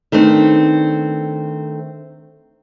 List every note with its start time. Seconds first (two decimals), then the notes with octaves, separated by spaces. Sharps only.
0.12 D#3 A3 B3 C4 D4